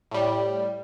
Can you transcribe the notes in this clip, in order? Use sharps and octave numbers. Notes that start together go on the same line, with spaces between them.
A2 G3